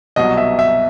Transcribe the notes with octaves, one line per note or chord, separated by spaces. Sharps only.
C2 B2 F#3 D#5
E5
E5